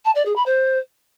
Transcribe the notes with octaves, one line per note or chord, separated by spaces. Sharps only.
A5
D5
G#4
B5
C5